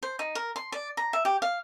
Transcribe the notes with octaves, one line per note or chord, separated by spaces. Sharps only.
C5
D#4
A#4
C6
D5
A#5
E5
G4
F5